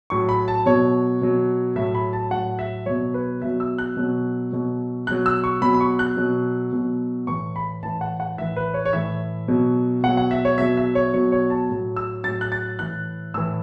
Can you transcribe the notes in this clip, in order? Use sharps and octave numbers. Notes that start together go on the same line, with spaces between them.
A2 F#3 C#6
B5
A5
B2 F#3 C#5
B2 F#3
A2 F#3 E5
B5
A5
A2 F#3 F#5
E5
B2 F#3 C#5
B4
B2 F#3 E5
E6
F#6
B2 F#3
B2 F#3
B2 F#3 F#6
E6
C#6
B2 F#3 B5
B5
C#6
F#6
B2 F#3
B2 F#3
A2 E3 C#6
B5
A2 E3 A5
F#5
F#5
A2 E3 E5
B4
C#5
C#5
A2 E3 E5
B2 F#3
B2 F#3 F#5
F#5
E5
C#5
B2 F#3 E5
E5
C#5
B2 F#3 C#5
C#5
A5
A2 F#3
E6
A2 F#3 A6
F#6
A6
A2 E3 F#6
A2 E3 E6